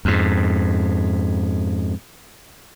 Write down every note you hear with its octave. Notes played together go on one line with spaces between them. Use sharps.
F2 G#2